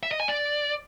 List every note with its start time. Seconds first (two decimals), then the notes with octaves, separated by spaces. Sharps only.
0.03 E5
0.11 D#5
0.20 G#5
0.28 D5